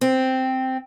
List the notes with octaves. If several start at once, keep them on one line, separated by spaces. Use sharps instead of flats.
C4